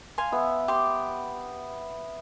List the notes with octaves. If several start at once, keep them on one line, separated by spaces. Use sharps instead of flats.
F5 G#5 C6
B3 E5
G4 C6